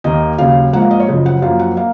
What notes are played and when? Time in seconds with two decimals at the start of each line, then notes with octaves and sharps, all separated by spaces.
0.04 D#2 D#3 A#3 D#5
0.38 D#2 C#3 F#3 F5
0.73 G#2 F3 A#3 F#5
0.82 F5
0.91 D#5
1.00 C#5
1.08 F#2 C#3 F3 D#5
1.26 F#5
1.42 F#2 F3 A#3 F5
1.59 F#5
1.77 A#3 F5